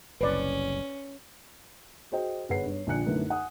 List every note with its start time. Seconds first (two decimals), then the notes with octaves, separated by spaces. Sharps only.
0.21 F#1 C2 C#4 B4 D5
2.12 F#4 G#4 C5 D#5 G5
2.49 G1 G#4 B4 C#5 F#5 C7
2.66 G2 C#5
2.87 A#1 D3 F3 G#5 F#6 C#7
3.05 F#2 D3 A3 B3 D#4 E4
3.30 F#5 G#5 D#6